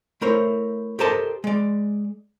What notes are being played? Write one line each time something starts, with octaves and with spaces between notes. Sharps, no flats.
A3 E4 A#4 C5 C#5
G4 A4 A#4 C5 D#5 A5
G#3 D5